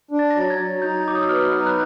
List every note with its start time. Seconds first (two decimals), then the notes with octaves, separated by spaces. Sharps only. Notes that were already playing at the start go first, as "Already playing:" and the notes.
0.11 D4
0.19 A6
0.30 F#3 A#6
0.41 A6
0.50 G#6
0.58 F#3
0.82 D#4 G6
1.05 F#3 D6
1.15 D#6
1.22 E6
1.29 B3 F6
1.52 D#4
1.66 F#6